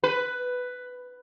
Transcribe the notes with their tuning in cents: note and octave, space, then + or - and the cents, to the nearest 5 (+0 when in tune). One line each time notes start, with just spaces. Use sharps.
B4 +10